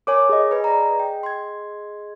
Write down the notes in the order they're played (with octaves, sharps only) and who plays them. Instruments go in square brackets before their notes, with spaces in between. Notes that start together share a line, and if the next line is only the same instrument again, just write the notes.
[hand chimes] A#4 C#5 G#5 [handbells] D6
[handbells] G#4 D#5
[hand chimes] B4 G#5
D5 A#5
G5
C6 G#6